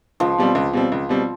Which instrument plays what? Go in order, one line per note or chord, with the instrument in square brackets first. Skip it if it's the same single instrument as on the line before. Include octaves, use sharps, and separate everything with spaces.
[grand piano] C#2 [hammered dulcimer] F3
[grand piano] B2 G3 C4
C#2
B2 G3 C4
C#2
B2 G3 C4